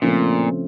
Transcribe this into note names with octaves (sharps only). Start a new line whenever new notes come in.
A#2 C#3 F3 A3 C4